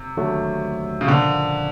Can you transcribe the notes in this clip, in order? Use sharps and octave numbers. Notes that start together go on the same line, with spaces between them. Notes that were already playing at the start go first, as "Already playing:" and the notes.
Already playing: C3
D#2 D3 F#3 A3
C#3
A#2 D3 F3 A#3